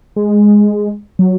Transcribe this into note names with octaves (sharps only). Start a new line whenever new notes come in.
G#3
F#3